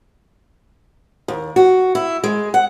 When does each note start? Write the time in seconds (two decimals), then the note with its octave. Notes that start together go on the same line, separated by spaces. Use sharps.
1.28 D#2
1.56 F#4
1.95 E4
2.24 G#3
2.54 F#5